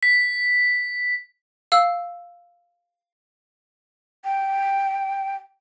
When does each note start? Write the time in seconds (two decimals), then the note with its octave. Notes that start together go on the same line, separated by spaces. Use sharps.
0.03 B6
1.72 F5 E6
4.25 G5